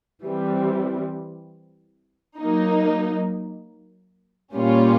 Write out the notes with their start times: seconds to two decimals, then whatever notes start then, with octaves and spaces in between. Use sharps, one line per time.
0.23 E3 G3 C4
2.39 F#3 A#3 D#4
4.55 A#2 G3 A#3 C#4 F4